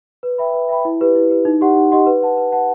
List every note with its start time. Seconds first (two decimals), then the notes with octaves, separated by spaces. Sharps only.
0.23 B4
0.38 E5 G5 B5
0.54 B4
0.69 E5 G5 B5
0.85 E4
1.00 G4 B4
1.16 E4
1.30 G4 B4
1.45 D#4
1.61 G4 D#5 F#5 C6
1.76 D#4
1.92 G4 D#5 F#5 C6
2.06 B4
2.22 F#5 A5
2.37 B4
2.52 F#5 A5